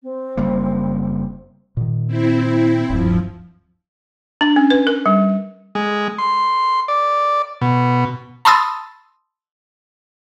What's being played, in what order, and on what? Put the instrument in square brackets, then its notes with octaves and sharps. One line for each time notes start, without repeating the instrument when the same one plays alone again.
[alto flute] C4
[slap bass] F#1 G3 A#3
[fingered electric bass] A#2 D#3
[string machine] C4 E4
[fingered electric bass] D1 G2 [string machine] F3
[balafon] D4
C#4
B4
A#4
G3
[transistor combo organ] G#3
C6
D5
B2
[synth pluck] A5 B5 C6 D#6 E6 A6